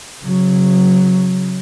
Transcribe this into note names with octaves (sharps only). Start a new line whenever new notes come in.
C#3 F#3